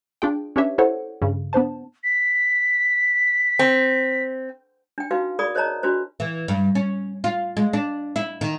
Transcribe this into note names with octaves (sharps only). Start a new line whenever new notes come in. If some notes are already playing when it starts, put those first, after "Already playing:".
D4 F4 G#4 G5
C#4 D4 G4 B4 C#5 E5
E4 A4 C5 C#5 F#5
G2 C#3
B3 D4 C5 A5
B6
C4
D4 G5
D#4 F#4 B4 F5
G#4 A#4 D5 B5 D#6
A#4 C5 C#5 D#5 A5 A#5
D4 F4 F#4 B4 C5
E3
G2
C#4
F4
G#3
D4
E4
D#3